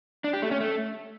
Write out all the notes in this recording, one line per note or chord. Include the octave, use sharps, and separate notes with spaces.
D4
G4
A3
C#4
A3